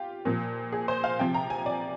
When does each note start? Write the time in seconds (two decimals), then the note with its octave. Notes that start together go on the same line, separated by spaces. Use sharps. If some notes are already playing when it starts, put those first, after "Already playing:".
Already playing: F4 G4
0.25 A#2 F3
0.72 G#4
0.88 C5
1.04 F5
1.19 C3 F3 G5
1.34 A#5
1.50 G#5
1.66 D5